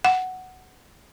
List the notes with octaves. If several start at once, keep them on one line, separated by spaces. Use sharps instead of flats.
F#5